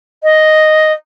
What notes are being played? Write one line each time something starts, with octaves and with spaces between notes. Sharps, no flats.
D#5